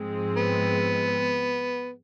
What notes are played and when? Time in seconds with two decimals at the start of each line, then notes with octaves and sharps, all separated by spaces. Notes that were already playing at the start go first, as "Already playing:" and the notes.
Already playing: G#2 F3 G#3 C4
0.37 B3